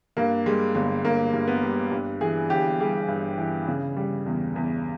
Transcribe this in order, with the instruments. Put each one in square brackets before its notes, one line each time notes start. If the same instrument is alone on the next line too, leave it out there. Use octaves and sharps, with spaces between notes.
[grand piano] G2 A#3
G3 G#3
G1 G#3
G1 A#3
G2
B3
G3
G2
E3 G#4
G1 G4
G3 G#4
G2
E3
C#3
G3
E2
E2